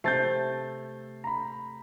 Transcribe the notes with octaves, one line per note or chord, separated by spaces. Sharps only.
C3 A3 G6 A6 C7
A#5 B5